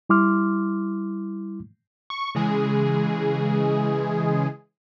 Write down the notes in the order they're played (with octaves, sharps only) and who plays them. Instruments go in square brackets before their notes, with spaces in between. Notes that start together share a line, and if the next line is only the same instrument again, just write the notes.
[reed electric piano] G3 E4 C6 D6 F6
[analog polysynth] C#6
C#3 E3 G#3 G#4